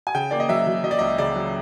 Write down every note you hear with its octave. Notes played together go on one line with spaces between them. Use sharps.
G#5
C#3 G5
A#3 D5
D#5
F#3 E5
F#3
F#3 D#5
D5
C#2 D#5
C#3 D5
F#3